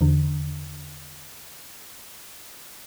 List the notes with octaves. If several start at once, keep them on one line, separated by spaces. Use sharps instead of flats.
E2 D3